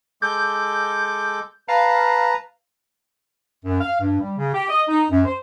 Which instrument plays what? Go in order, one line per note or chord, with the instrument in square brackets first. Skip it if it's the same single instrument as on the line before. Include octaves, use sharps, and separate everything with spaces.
[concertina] G#3 A4 D6 [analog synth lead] G6
[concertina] B4 A5 A#5 [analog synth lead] F5
[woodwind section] F#2
F5
G2
G3
C#3
G4
D#5
D#4
F#2
C5